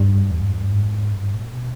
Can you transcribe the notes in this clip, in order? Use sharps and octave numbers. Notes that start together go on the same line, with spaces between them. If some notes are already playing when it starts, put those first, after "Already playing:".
Already playing: G2
E2
G2
E2
G2
G#2
G2
A#2
B2